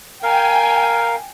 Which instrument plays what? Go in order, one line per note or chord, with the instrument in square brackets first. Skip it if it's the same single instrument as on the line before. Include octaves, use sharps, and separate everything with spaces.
[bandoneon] A#4 F5 [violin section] G5 G#5